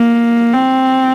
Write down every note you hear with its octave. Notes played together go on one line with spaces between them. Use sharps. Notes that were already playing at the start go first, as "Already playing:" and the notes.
Already playing: A#3
C4